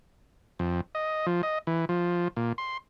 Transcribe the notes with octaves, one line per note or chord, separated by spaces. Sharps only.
F2
D#5
F3
D#5
E3
F3
A#2
C6